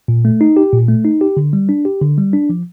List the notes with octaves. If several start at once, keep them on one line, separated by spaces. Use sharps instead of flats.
A#2
A3
D#4
G4
A#2
A3
D#4
G4
D3
G3
D4
G4
D3
G3
D4
F3